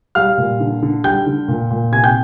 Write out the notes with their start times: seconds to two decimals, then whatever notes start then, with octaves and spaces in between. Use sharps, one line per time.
0.15 G3 F5 F6
0.38 A#2
0.60 D3
0.82 D3
1.04 G3 G5 G6
1.26 D3
1.48 A#2
1.71 A#2
1.92 C3 G#5 G#6
2.04 G5 G6